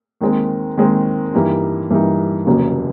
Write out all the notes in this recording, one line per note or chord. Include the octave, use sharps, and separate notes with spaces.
D#2 D#3 G#3 C4
D#2 D#3 G#3 C4
G2 E3 G3 A#3 D#4
G2 E3 G3 A#3 D#4
F1 D#2 C#3 F#3 A#3